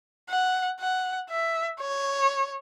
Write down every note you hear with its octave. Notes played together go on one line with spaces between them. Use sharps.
F#5
F#5
E5
C#5